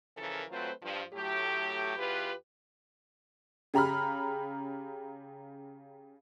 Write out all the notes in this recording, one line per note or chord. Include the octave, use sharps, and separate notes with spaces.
C#3 E3 F3 A4 A#4
F#3 A3 C4 F4 B4 C5
G2 F3
A2 F#3 A3 G4
E2 F4 G4 B4
C#3 G4 A#5 B5 F6